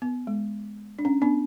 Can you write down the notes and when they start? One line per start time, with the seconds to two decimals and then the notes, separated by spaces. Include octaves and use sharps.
0.02 B3
0.27 G#3
0.99 D4
1.05 C#4
1.22 B3 D4